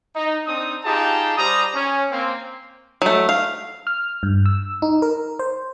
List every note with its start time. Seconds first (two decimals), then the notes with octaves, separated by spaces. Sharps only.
0.16 D#4
0.46 C4 D4 D#4 D#6
0.84 D#4 F4 G4 G#4 A5
1.38 G3 C5 A#5 D#6
1.75 C#4
2.11 A#3 C4
3.02 F#3 A3
3.29 F5
3.87 F6
4.23 G2
4.46 E6
4.82 D#4
5.02 A#4
5.39 C5